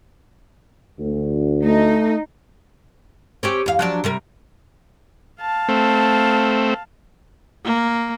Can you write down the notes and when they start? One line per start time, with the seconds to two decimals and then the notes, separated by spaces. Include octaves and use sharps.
0.99 D2
1.63 A3 D#4
3.43 C4 C#4 G4
3.66 E2 F5
3.79 F3 F#3 D4
4.04 C3 G3 A#4
5.40 F5 A5
5.69 A3 C4
7.64 A#3